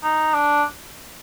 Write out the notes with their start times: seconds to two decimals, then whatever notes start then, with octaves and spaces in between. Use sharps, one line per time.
0.03 D#4
0.34 D4